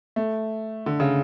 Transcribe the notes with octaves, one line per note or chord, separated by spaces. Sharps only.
A3
D3
C#3